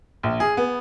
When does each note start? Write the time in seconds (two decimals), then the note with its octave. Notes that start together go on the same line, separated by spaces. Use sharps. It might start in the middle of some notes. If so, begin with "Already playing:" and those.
0.23 A#1
0.40 G#4
0.57 B3